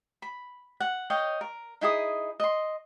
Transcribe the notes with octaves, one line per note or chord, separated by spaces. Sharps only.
B5
F#5
C#5 D#5 F5 G5
A#4
D#4 E4 G#4 D#6
D#5 C6